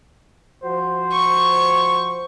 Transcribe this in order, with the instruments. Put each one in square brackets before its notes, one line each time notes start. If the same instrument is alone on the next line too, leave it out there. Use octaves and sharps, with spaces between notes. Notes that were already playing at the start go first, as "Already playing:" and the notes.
[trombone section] F3 F#4 C5
[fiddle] C#6